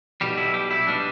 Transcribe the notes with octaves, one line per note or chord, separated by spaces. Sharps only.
B1 B2 G3 G4
E4
G4
E4
B2 G3 D4